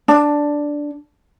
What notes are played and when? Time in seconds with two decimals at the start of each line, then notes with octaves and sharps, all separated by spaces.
0.08 D4